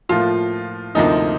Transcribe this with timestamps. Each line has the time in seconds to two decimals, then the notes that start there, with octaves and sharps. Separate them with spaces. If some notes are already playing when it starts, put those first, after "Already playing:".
0.09 A2 F3 A#3 F4
0.95 D2 C3 F3 A#3 D#4